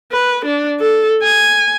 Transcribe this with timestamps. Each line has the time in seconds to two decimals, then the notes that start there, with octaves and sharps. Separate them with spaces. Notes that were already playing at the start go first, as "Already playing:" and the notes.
0.12 B4
0.45 D4
0.80 A4
1.23 G#5